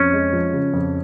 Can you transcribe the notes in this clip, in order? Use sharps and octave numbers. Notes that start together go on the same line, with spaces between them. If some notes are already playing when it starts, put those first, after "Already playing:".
Already playing: F2 C#4
G#3
F3
C#3
F2